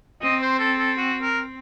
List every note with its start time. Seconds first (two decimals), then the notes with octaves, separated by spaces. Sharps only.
0.23 C4 D#5
0.42 C5
0.60 A4
0.79 A4
0.98 F#4
1.22 A#4